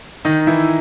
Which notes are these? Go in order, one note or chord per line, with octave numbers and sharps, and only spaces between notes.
D#3 D#4
E3 E4